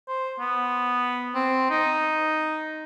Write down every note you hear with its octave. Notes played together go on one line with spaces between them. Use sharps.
C5
B3
C4
D#4